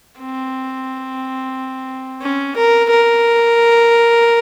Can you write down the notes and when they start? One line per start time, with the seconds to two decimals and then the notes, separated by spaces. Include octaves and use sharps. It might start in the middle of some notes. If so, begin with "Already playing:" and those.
0.19 C4
2.21 C#4
2.56 A#4
2.89 A#4